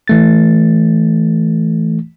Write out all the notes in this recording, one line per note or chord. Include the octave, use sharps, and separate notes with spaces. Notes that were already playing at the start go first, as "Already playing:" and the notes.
E3 A3 A6